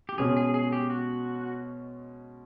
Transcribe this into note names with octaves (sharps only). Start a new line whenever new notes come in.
G4
B2 G#3 C#4 G#4
G#4
G#4
G4
F#4